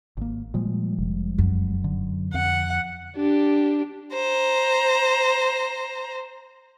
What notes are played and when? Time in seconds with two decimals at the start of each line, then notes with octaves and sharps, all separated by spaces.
0.17 G#1 A#3
0.54 A#2 F3 G3 G#3
0.99 F1
1.38 F#2
1.84 D3
2.34 F2 F#5
3.17 D4 G4
4.14 C5 A#5